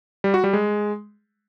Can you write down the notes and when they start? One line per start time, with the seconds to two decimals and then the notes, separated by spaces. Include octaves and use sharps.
0.24 G3
0.34 F#4
0.44 G3
0.53 G#3